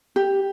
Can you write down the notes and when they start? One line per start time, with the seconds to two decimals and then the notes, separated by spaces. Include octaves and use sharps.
0.16 G4